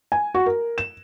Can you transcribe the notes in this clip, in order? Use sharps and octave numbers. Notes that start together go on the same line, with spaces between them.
G#5
F#4
A#4
E7